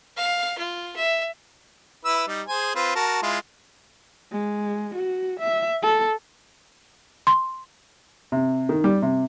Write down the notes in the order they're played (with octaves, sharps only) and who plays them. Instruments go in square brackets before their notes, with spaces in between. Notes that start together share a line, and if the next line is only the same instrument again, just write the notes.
[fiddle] F5
F4
E5
[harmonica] E4 B4 E6
G3 D#4
G#4 C5 G#5
C4 F4 B4
F#4 A#4 A5
G#3 E4 F4
[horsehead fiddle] G#3
F#4
E5
A4
[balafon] C6
[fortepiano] C3
D#3
G3
C3